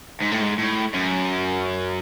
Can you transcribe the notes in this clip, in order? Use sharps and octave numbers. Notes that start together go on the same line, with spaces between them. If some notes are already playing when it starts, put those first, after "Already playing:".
G#2
A2
G#2
A2
F#2